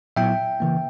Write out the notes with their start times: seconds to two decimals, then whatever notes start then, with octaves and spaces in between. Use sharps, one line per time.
0.16 A#2 F#3 B3 E4 E5 G5
0.60 C#3 E3 A#3